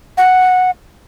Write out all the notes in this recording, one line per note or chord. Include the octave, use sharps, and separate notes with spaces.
F#5